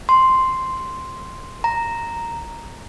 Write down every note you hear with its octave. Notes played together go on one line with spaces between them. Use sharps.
C6
A#5